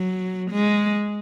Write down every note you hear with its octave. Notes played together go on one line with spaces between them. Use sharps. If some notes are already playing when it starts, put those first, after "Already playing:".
Already playing: F#3
G#3